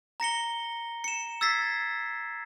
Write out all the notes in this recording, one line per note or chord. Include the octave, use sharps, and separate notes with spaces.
A#5 A#6 C#7 G7
C#7 E7
E6 G#6 A6 B6 C7